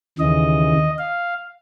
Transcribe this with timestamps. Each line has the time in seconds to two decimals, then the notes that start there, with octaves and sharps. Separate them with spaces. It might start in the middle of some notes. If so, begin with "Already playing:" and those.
0.18 D#2 C#3 E3 D#5
0.98 F5